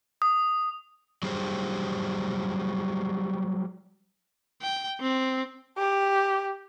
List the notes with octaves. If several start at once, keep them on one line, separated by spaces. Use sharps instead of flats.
D#6
F#3 G3 G4 G#4 C5
G5
C4
G4